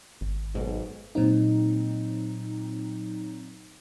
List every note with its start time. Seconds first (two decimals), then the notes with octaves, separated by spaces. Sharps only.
0.21 G#1
0.55 B1 G#2 B2
1.15 A#2 F#3 C4 D#4